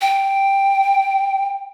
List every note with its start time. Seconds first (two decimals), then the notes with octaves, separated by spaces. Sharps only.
0.01 G5